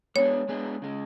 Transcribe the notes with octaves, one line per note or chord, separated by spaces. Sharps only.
G#3 B3 D4 G#4 C#5
G#3 B3 D4 G#4
C#3 G#3